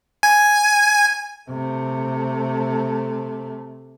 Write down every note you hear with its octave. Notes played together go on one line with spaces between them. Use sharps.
G#5
C3 A3